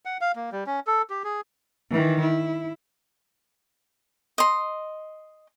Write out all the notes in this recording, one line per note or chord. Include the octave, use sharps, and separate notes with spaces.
F#5
F5
A#3
G3
C#4
A4
G4
G#4
D#3 E3
E4
D#5 C6